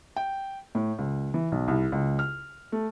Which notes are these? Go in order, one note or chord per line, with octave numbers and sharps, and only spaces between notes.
G5
A2
C#2
E3
B1
C2
C#2
F6
A3